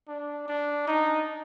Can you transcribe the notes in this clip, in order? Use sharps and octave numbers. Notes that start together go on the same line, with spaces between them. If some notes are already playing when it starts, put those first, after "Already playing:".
D4
D4
D#4